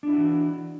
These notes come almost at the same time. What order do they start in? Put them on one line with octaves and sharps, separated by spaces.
D4 E4 F#4 E3